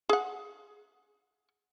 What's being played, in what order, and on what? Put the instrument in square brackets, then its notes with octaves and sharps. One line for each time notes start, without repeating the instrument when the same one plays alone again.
[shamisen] G#4 F#5